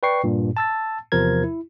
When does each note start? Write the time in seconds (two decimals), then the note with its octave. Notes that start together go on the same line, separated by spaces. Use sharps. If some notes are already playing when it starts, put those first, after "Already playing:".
0.03 B4 D5 G5 C#6 C7
0.24 G2 A#2
0.57 A5 E6 A6
1.12 E2 C3 F3 A#4 G#6
1.44 E4